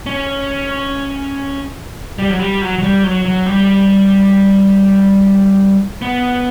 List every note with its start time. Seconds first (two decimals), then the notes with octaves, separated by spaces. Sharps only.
0.06 C#4
2.19 G3
2.29 F#3
2.39 G3
2.62 F#3
2.78 F#3
2.83 G3
3.04 F#3
3.25 F#3
3.46 G3
6.02 B3